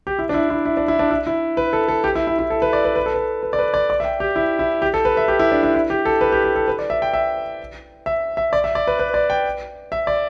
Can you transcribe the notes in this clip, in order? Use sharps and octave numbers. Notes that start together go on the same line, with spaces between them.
G4
E4
D4
E4
E4
E4
D4
E4
D4
E4
E4
B4
A4
A4
G4
E4
E4
E4
A4
B4
D5
B4
B4
A4
B4
B4
D5
B4
D5
D5
E5
G5
G4
E4
E4
G4
A4
B4
E5
G4
E4
D4
E4
E4
G4
A4
B4
G4
G4
A4
B4
D5
E5
G5
E5
E5
E5
D5
E5
D5
B4
B4
D5
G5
E5
D5